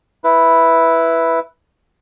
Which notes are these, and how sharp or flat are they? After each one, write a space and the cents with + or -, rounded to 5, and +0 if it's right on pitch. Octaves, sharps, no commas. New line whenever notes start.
E4 +0 B4 +0